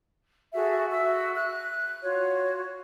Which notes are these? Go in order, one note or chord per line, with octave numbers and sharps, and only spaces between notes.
F#4 G#4 A4 E5
F#4 E5 E6
F#6
F4 F#4 C#5